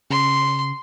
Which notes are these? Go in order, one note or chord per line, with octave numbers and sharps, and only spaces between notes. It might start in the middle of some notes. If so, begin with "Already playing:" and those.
C#3 C6